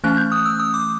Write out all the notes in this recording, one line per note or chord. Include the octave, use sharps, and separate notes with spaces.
E3 A3 C#4 F#6
G6
D#6
E6
D#6
D6